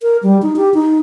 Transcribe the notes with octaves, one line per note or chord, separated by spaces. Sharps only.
A#4
G3
D#4
G4
D#4